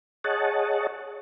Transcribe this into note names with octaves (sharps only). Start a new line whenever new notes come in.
G#4 C#5 D#5 F#5 A5